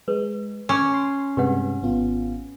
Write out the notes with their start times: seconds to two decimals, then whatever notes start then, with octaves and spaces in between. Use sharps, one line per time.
0.08 G#3 B4
0.69 C#4 D6
0.94 C6
1.37 G2 C3 G#3 G4 B4 F#5
1.82 G#1 B3 F4